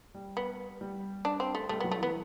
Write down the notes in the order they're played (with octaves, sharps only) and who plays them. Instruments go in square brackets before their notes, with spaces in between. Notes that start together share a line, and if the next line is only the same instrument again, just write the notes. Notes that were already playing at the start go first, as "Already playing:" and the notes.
[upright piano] G3
[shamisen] B3
[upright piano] G3
[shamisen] D4
C4
A3
[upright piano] G3 [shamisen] A3
[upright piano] F#3 [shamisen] B3
[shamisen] A3
[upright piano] E3 [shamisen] B3